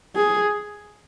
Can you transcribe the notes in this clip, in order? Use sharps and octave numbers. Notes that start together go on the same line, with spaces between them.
G#4